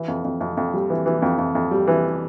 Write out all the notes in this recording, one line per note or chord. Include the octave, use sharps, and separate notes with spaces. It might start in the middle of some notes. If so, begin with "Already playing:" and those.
Already playing: E3
F2
F2
F2
F2
G3
E3
E3
F2
F2
F2
G3
E3